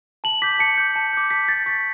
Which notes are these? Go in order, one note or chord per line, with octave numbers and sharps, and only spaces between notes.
A5 F#7
D6 G6 B6
A5 C#7
D6 G6
A5
D6 G6
A5 B6
D6 G6 A6
C#6 B6